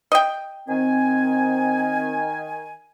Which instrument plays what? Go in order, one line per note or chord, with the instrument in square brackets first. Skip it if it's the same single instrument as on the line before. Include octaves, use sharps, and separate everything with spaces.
[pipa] D#5 G5
[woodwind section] D#3 G#5 [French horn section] C4